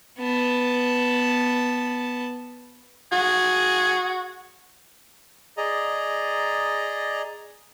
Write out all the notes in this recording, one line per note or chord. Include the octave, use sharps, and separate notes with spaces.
B3 A5
F#4 G#4
G#4 D5 D#5 A#5